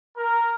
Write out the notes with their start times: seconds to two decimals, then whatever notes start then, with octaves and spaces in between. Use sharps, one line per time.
0.17 A#4